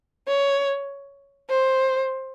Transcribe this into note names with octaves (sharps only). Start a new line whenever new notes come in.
C#5
C5